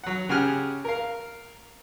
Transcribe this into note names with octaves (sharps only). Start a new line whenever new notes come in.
F#3 F#5
C#3 G4 F#5 G#5 F6
A#4 F5